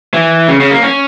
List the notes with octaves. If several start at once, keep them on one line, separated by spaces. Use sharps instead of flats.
E3
C#3
C#3
A#3
C#4